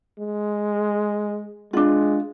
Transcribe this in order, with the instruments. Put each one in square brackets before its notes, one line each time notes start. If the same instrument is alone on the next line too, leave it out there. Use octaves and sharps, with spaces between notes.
[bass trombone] G#3
[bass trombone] G#3 [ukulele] D4 F4